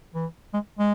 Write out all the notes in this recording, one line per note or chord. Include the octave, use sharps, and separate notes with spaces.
E3
G#3
G#3